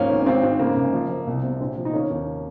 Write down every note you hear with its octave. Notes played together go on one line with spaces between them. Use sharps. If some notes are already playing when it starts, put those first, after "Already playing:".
Already playing: G#2 F3 A#3 C#4
G#1
C#4
G#1 C4
G#2
C#3 A#3
F#1
F3
F3
C2
C3
A#1 C4
F3
D#4
D#3 A#3 C#4
D#2